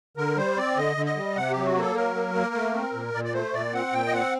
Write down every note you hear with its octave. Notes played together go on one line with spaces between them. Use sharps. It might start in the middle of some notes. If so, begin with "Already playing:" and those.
D3 A#4
G3 C5
C4 D5
D3 D#5
D3
D#5
G3
C3 F#5
F#3 G4
F#4
A#3 A4
F#3 A#4
A#3
A#3
A3
C4
A#2
A#2 D5
D5
A3 C5
A#2 D5
C4 F#5
A#2 G5
D#5
C4 F#5